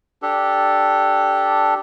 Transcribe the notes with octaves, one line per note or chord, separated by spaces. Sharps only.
D4 G4 A4